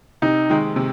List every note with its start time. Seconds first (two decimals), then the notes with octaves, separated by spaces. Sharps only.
0.22 C3 D#4
0.49 D#3 G#3
0.76 C3